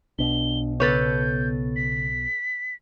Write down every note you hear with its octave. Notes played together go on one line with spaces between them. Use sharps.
B1 B2 D4 G7
C#3 B3 A4 B4 C#5 G6 A6
B6